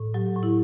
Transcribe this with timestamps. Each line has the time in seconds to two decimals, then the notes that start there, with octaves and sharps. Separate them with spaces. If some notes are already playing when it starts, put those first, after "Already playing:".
Already playing: A2
0.14 F#3 G4
0.36 A2
0.43 E4